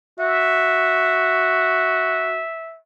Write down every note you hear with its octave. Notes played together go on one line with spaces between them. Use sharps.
F#4 E5